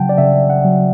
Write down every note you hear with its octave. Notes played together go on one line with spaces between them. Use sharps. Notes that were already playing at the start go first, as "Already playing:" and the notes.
Already playing: C#3 F#3 F#5 G5 A5
D5
C#3 E5
F#5
F#3